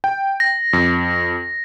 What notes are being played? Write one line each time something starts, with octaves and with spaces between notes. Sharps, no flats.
G5
A#6
F2